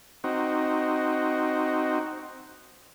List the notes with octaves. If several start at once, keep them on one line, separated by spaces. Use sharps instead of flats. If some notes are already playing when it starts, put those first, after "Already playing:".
C4 D#4 F#4